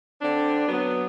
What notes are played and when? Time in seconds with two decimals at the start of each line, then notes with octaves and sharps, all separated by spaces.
0.22 D3 C4 D4
0.68 F#3 B3